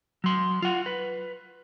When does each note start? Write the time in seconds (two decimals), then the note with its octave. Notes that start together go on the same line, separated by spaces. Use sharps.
0.24 F#3 C6
0.62 F4 F#5
0.86 B4